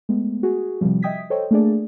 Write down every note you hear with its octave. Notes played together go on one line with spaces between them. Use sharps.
G#3 A3 B3
F#4 G#4
C3 D#3 F3 G3
D#5 E5 G5 D#6 G#6 B6
A4 C5 C#5 D#5 G5
A3 A#3 D4 G#4 D5